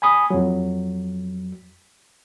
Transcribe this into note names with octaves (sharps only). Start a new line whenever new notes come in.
G#5 B5 D#6
F2 F#3